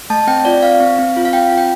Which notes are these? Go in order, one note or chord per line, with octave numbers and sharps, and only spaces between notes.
A3 A5
C4 G5
F4 D5
C4 F5
C4
C4
F4
F5
C4 G5
F4
G5